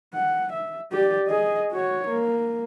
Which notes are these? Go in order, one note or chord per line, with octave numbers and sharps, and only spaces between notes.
F#5
E5
G4 D5
G#4 D#5
F#4 C#5
A#3